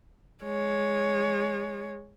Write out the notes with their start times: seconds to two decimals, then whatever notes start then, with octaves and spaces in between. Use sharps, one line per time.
0.44 G#3 C#5